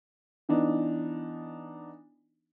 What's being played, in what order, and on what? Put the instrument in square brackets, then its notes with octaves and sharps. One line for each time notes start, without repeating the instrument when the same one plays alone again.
[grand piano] E3 B3 D4 D#4